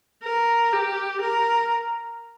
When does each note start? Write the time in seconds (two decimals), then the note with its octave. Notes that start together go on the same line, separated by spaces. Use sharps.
0.24 A#4
0.73 G4
1.21 A#4